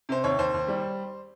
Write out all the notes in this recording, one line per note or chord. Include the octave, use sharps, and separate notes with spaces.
C3 C5
D#2 C#5
D#2 C5
D#2
G3